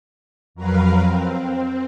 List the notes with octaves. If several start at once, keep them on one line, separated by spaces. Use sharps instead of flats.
F2 F#3 A#4 B4 F5
C4